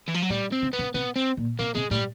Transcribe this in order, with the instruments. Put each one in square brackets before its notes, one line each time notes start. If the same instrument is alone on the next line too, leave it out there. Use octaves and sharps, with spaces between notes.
[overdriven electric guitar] E3
F3
F#3
[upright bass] A2 [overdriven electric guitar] G3
[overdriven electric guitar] C4
[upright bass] C#3
[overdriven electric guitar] B3
[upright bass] C#3
[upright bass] C3 [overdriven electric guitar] B3
[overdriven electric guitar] C4
[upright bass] A#2
[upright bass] C3 [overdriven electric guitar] A#3
[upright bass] C3 [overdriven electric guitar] G#3
[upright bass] A2 [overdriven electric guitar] G3